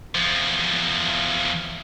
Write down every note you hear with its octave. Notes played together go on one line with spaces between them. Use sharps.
E2 F3